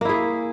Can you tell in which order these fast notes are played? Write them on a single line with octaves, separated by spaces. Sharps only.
A#3 E4 G#4